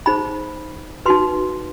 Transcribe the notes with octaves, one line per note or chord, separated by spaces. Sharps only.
D#4 G#4 C5 B5
D#4 F#4 B4 C6